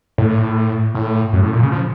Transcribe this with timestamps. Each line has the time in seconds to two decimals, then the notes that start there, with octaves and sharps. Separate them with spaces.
0.18 A2
0.95 A2
1.33 F#2
1.43 A2
1.53 A#2
1.63 C#3
1.72 F3